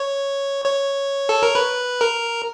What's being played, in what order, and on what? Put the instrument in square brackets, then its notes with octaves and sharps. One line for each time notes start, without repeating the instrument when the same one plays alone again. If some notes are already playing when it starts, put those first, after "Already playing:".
Already playing: [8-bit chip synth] C#5
C#5
A4
A#4
B4
A#4